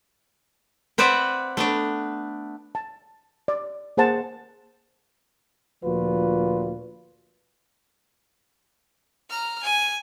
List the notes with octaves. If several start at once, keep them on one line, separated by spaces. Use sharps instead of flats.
C4 B4 C5 D5 E5 F#5
A3 B3 D4
A5
D5
A#3 G#4 C5 F#5 A5
D2 A#2 F3 F4 F#4 B4
A#5 F6
G#5